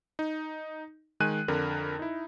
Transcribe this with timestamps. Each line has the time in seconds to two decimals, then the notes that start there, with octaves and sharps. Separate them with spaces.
0.19 D#4
1.20 D#3 G#3 G#5 F#6 D#7
1.48 F2 D3 A#4
1.99 D#4 E4